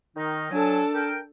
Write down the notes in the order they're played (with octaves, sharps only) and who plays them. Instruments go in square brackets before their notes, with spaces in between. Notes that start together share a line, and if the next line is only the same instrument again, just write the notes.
[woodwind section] D#3 D#4
[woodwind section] F#3 G#5 [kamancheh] D4 A4
[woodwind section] A#4 G5